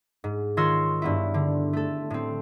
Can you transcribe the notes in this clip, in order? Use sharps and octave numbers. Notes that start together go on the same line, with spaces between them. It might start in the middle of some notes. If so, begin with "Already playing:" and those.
G#2
D#3 F4 C#5 C6 E6 A#6
G2 B3 E4
D3
A3 A4
A2 C4